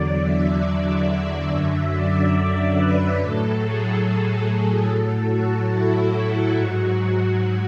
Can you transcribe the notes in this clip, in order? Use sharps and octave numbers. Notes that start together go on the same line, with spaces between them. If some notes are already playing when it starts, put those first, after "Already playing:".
Already playing: E2 D3 F#3 D5
E5
D5
E5
F#2 D3 F#3
D5
B4
A2 F#3 A4
G#4
A4
A2 F#3
F#4
E4
G#2 F#3 F#4